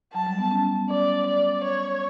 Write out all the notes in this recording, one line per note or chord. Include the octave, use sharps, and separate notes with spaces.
F#3 A5
G3
B3
C#4
D5
D5
C#5